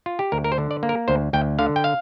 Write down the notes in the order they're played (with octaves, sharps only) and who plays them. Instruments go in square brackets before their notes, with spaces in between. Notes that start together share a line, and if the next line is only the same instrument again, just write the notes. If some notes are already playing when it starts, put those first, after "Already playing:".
[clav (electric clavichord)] F4
G4
D2 A#4
A#4
C5
D3
D5
A#3
A#4
D2 C5
D2 G5
D3 F5
G5
F5